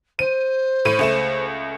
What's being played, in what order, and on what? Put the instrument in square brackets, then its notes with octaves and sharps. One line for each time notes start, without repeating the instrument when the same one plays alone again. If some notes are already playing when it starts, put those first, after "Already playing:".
[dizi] C5 [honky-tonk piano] D#7
[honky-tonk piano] A2 D#7
C#2 A3 E7